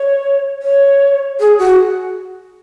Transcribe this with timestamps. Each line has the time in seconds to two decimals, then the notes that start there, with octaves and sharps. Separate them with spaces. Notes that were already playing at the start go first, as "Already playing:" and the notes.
Already playing: C#5
0.62 C#5
1.40 G#4
1.59 F#4